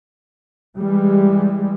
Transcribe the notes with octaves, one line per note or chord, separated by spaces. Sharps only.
E3 G3 G#3